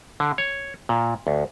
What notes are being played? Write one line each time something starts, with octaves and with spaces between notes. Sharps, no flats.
D3
C#5
A#2
D2